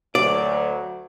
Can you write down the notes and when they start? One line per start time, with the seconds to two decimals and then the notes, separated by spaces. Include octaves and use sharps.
0.15 D2 F#3 D5